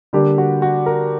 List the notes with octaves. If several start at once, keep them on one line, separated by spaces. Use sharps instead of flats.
D3 G3 A#3 D4 G4
F#4
F#4
A#4